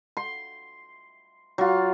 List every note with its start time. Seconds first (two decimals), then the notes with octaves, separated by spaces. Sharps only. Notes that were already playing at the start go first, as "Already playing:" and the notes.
0.17 C6
1.58 F#3 F4